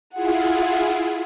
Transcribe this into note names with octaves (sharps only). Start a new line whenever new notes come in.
E4 F4 G#4 F#5